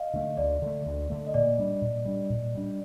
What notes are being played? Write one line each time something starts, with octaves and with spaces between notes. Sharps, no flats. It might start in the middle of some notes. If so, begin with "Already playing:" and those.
Already playing: D#5 F5
D3 A3
D2 D5
D3 A3
D2
D3 A3
D#5
A#2 D5
G3 D4
A#2
G3 D4
A#2
G3 D4